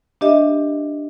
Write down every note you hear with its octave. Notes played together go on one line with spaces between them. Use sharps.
D4 G4 D#5 E5